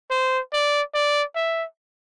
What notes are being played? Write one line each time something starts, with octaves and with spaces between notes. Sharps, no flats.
C5
D5
D5
E5